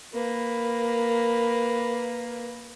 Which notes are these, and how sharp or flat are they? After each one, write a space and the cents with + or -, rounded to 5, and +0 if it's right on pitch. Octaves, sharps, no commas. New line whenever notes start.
A#3 +0 B4 +0